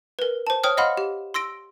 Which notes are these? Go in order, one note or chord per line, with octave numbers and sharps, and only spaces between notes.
A#4 B4
C5 A5
C5 C#5 G5 D#6 F6
D#5 F5 F#5 B5 C6 F6
G4
C6 E6 A#6 D7